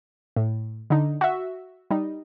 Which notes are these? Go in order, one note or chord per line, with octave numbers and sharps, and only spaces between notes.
A2
D3 D#4
F#4 E5
G3 D#4